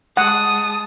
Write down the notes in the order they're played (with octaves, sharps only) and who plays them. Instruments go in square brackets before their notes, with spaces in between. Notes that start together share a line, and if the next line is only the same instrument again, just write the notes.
[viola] G#3 A5 [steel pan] F#5 [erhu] D#6